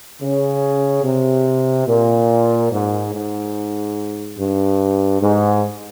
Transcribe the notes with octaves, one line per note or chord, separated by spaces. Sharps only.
C#3
C3
A#2
G#2
G#2
G2
G#2